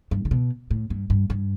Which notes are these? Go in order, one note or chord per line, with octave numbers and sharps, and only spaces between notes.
G2
D3
B2
A2
G2
G2
G2